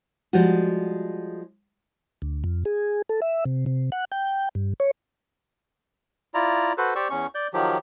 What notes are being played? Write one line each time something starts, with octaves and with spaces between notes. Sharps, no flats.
F3 G3 G#3 F#4
D2
F2
G#4
A4
E5
C3
C3
F#5
G5
G2
C#5
E4 F4 D5 A#5
F#4 A4 B4 C5
G4 C5 D5 C#6 E6
E2 C#4 C#6
D5 G6
D#3 F3 F#3 G4